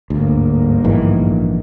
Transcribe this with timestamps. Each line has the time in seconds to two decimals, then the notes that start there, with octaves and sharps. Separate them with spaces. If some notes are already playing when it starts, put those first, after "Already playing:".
0.10 G1 D2 G#2 A#3
0.84 A#1 D#3 E3